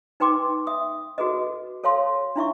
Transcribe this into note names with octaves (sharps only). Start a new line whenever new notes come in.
D#4 B4 G5 C6 D6
E5 D#6
F#4 G#4 A4 B4 D#5
A4 C#5 F5 A5 C6
D4 E4 E5 C#6